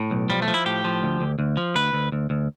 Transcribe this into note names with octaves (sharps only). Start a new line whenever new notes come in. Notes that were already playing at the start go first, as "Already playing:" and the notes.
Already playing: A2
B1
F3 G3
A3
F3
E4
A2 G4
F3
D2
D2
D2
F3
D2 B4
D2
D2
D2